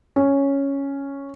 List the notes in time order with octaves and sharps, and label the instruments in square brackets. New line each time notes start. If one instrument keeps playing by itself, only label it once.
[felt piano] C#4